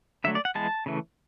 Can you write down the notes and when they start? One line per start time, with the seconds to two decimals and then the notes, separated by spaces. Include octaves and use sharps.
0.24 D3 F#3 A3 E5
0.35 D5
0.45 F#5
0.55 E3 G#3 B3 A5
0.86 C#3 E3 A3